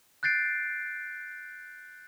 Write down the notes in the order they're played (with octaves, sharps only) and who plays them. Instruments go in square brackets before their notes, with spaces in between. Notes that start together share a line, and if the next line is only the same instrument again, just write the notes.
[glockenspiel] F#6 G6 A6 C7 D7